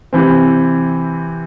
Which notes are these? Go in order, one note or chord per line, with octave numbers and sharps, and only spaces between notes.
C3 E3 C4